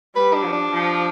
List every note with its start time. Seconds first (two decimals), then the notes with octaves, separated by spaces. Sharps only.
0.16 G3 B4
0.34 D4
0.43 F3
0.53 D4
0.71 F3